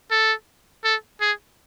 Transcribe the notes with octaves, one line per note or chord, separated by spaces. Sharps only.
A4
A4
G#4